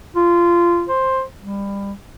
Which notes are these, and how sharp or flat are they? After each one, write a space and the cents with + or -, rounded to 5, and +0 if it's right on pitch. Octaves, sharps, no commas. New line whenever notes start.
F4 -20
C5 +10
G3 +25